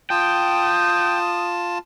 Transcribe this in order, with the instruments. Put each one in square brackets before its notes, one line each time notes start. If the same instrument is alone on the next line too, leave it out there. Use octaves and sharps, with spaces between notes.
[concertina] F4 A5 [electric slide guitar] G5 [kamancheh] D#6